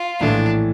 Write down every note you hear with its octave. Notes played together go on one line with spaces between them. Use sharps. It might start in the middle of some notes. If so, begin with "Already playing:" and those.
Already playing: F4
A#1 A2 E3 A3 D4